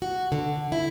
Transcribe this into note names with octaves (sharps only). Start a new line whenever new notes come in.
F#4
D3
E4